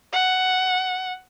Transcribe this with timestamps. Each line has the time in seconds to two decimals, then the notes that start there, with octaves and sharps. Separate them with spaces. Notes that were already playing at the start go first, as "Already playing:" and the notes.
0.13 F#5